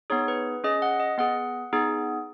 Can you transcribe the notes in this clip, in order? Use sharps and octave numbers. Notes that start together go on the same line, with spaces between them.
B3 D#4 G#4 C#5
B4
C#4 G#4 D#5
F#5
D#5
B3 G#4 F#5
B3 D#4 G#4